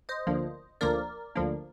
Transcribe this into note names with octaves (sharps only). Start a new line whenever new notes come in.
C5 D#5
D2 D3 F3 A#3 D4
D2 D3 F3 A#3 D4 A#4 D5
D2 D3 F3 A#3 D4